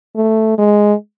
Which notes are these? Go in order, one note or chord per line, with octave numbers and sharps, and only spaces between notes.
A3
G#3